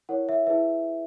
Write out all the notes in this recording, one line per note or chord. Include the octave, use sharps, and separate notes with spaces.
E4 A#4 C#5 F#5
E5
E4 G#4 B4 E5